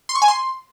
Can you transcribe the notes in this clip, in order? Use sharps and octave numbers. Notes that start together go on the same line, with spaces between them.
C6
C#6
G#5
C6